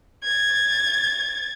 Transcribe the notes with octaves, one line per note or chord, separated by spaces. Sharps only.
G#6 A6